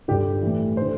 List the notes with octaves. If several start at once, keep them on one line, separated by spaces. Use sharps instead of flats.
G2 D3 G4
A2 E3
D3 C5